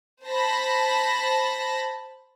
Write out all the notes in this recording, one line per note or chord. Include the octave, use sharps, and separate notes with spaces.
C5 A5 B5 A#6